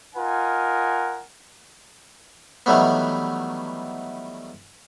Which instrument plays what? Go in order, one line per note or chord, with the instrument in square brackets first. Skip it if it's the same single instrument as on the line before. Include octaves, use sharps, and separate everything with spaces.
[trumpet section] D#4 F4 A#4 F#5 G#5
[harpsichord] D#3 E3 F#3 G3 A3 B3